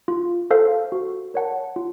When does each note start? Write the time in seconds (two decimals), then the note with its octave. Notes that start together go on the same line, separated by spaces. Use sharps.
0.08 F4
0.51 A4 C5 F5
0.92 F#4
1.34 A#4 C#5 F#5 A5
1.76 F4